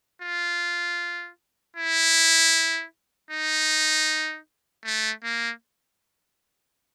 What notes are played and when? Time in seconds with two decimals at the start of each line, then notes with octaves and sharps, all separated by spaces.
0.22 F4
1.76 E4
3.31 D#4
4.84 A3
5.24 A#3